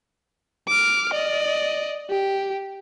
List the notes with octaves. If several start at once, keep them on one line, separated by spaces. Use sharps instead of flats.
D6 F6
D5 D#5
G4